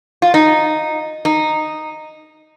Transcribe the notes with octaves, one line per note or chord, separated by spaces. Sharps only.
F4
D#4
D#4